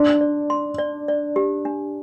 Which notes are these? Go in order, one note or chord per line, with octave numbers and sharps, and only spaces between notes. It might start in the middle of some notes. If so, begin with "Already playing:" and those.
Already playing: D4 C6
D5
C6
D5
D5
G4
D4